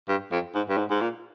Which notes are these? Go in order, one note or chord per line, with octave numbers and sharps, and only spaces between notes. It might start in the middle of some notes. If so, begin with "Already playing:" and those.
G2
F2
G#2
G2
G#2
G#2
A#2